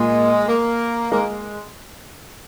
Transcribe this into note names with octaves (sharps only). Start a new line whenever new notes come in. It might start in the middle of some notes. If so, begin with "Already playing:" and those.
Already playing: A#2 G#3 A#3 F4
A#3
G#3 A#3